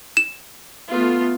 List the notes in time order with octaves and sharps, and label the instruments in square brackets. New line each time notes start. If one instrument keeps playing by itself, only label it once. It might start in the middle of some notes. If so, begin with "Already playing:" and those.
[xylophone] E7
[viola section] A3 B3 F4